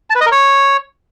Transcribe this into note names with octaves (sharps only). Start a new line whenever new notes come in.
A5
B4
D#5
A#4
C#5